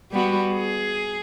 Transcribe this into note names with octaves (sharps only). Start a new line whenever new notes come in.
G3 B3 F#4
G#4